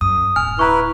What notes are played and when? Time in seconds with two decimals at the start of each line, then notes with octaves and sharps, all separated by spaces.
0.01 F#2 D#6
0.36 D1 G#5 F6
0.59 E4 B4 A#5 C#6